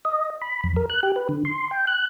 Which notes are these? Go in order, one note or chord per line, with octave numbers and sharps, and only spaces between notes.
D#5
B5
F2
A#4
F#6
G4
B4
D3
C6
G5
F#6